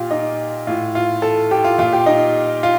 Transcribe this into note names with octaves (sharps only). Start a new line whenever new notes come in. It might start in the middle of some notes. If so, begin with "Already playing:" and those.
Already playing: A#2 F4 G4
D#4
A2 F4
F4
A4
G4
F4
A#2 F4
G4
D#4
F4